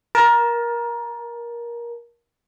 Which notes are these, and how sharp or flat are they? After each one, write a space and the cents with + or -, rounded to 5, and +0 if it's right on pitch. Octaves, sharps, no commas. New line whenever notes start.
A#4 +20 A5 +0